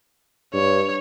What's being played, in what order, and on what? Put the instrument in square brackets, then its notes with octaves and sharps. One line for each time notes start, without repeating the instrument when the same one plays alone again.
[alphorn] G2 [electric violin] C#5